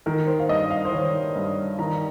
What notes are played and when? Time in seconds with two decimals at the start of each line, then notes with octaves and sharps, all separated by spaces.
0.06 D#3 A#4
0.27 C5
0.39 F5
0.49 G2 D#5
0.70 F5
0.85 C5
0.92 D#3 C#5
1.35 G2
1.79 D#3 A#5